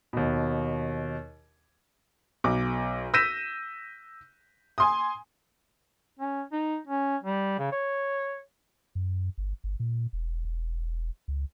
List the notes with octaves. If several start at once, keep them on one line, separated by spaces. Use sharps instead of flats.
D#2 B2
B1 D6
E6 G6 A#6 B6 D#7 E7
G#5 C6 D#6
C#4
D#4
C#4
G3
C#3
C#5
F#2
G1
G1
A#2
E1
E1
C#2